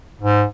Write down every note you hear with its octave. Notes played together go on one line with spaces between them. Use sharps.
G#2